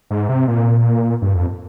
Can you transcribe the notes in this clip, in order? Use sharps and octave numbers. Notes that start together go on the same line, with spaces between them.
G#2
C3
A#2
G2
F2